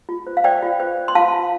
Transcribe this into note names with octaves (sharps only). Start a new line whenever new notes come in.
F4
C5
F5
C5 D5 G5
F4
C5
C5
C6
F4 F5 A5
F4